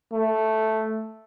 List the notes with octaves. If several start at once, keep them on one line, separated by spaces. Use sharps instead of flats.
A3